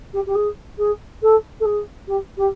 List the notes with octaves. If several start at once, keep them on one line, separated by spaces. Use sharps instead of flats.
G4
G4
G#4
G#4
A4
A4
G#4
G4
G4